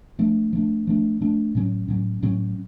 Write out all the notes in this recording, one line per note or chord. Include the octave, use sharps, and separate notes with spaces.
F3 A3 D4
F3 A3 D4
F3 A3 D4
F3 A3 D4
A2 F#3 C#4
A2 F#3 C#4
A2 F#3 C#4